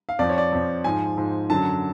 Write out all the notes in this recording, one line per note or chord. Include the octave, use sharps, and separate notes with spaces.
F5
F2 F3 D5
C#5
D5
F2 F3
G#2 F3 G#5
G#2 F3
F#2 D3 F#3 A5